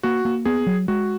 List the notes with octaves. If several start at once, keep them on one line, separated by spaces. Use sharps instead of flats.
A#3 F#4
A#3
B3 G#4
F#3
G#3 F#4